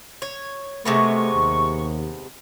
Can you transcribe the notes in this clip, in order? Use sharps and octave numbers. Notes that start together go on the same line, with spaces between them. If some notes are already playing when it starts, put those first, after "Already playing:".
C#5
C3 G#3 A3 B3 C#6
D#2